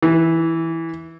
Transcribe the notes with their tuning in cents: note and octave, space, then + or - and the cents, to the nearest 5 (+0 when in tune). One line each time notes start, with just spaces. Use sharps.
E3 -5